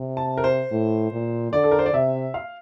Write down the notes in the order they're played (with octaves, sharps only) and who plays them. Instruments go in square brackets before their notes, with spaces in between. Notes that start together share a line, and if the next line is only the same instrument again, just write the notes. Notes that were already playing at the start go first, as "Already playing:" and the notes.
Already playing: [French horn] C3
[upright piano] A5
A#4
C5
[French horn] A2
A#2
[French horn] D3 [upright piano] D5
[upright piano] A4
A#4
C5
D5
[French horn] C3 [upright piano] E5
[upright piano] F5